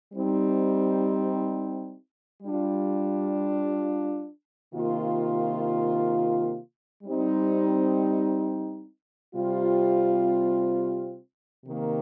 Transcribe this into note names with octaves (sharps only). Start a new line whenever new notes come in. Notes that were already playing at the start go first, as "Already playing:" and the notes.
G3 C4 D#4
G3 D4 F4
C3 D#3 A#3 F4
G3 C4 D#4
C3 G3 C4 F4
C3 D#3 A#3